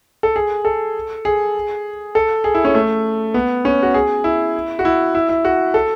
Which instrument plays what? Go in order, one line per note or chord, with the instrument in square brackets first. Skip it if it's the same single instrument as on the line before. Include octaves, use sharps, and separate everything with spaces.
[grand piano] A4
G#4
A4
G#4
A4
G#4
E4
C#4
A3
B3
C#4
F#4
G#4
E4
F#4
E4
E4
E4
F#4
A4